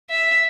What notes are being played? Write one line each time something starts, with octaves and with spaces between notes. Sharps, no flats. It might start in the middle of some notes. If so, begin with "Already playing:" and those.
E5